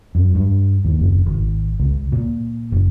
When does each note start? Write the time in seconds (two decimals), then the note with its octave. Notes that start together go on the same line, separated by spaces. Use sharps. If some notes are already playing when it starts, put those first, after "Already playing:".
0.15 F#2
0.35 G2
0.85 D#2
0.99 F#1
1.26 G#1
1.80 C#2
2.12 A#2
2.72 F#1